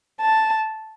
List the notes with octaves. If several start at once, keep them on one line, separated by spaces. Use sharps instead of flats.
A5